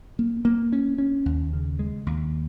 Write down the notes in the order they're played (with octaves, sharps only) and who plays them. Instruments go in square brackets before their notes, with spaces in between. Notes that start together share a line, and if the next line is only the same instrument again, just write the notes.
[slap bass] A#3
A#3
C#4
C#4
D#2
C#3
G#3
D#2